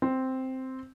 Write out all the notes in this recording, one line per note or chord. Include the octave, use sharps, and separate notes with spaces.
C4